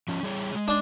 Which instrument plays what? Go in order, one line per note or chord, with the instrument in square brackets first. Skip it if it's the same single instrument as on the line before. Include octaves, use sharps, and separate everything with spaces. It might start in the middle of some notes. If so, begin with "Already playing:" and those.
[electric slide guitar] F3 C#4
G3 G#4 C#5
G#3
[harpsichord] D4